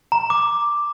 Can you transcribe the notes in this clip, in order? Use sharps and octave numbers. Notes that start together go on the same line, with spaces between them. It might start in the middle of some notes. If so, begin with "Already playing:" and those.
A#5
D6